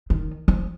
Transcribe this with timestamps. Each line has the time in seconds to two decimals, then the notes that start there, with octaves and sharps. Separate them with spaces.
0.10 D#3
0.48 F3